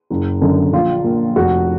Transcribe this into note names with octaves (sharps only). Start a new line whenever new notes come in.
F#1
F#2 D3
A#1 F4
A#2
F1 F#4